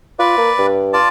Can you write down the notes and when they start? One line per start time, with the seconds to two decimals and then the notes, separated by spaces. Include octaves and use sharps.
0.19 F4 B4 D5
0.38 A#3
0.59 G2
0.93 F4 D5 A5